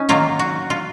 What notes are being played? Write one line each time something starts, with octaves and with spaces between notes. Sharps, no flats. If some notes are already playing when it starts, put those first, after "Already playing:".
Already playing: C#4 D#4
D#3 F#3 A#3 F4
F#4
F4